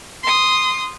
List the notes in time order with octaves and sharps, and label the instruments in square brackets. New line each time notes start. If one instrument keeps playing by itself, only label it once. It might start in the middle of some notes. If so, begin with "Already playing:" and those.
[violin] C6 D#6